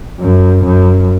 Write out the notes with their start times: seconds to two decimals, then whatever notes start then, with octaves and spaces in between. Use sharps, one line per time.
0.20 F#2
0.65 F#2